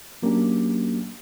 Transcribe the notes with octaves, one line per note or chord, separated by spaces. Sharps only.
F#3 A#3 C#4 D4 G4